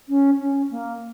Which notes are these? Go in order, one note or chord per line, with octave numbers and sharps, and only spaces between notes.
C#4
C#4
A#3